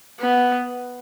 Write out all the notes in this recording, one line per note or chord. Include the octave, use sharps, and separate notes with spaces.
B3